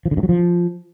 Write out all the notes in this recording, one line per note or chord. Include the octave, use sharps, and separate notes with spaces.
F3
D3
G2
F#3
F3